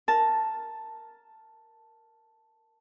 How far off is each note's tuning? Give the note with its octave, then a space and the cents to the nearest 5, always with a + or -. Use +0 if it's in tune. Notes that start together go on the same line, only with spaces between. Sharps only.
A#4 +0 A5 +0